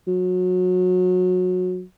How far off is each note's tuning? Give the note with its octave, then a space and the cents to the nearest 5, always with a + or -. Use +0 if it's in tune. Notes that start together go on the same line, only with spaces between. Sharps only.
F#3 -25